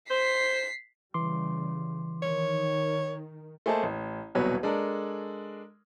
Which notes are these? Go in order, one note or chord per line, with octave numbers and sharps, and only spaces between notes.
C5 B6 C7
C#3 E3 G3 C6 D6
D#3 C#5
A3 A#3 G#4 C5 D#5 A5
A1
D#1 C2 B2 F#3 B4 C#5
G#3 D4 A4 A#4